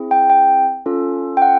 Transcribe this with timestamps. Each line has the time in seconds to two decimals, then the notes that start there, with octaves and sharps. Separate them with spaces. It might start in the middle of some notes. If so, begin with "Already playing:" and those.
Already playing: C4 E4 G#4
0.11 G5
0.30 G5
0.86 C#4 F4 A4
1.37 G5
1.42 F#5